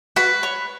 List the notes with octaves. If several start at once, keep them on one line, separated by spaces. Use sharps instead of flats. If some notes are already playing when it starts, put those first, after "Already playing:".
F#4 B4 B5
C#5